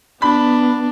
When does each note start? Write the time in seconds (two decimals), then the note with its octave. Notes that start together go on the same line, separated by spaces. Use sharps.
0.22 B3 D4 B5